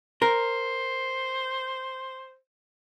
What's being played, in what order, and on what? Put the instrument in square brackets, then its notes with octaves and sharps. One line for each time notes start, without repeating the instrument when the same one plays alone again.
[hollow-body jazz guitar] A#4 [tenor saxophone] C5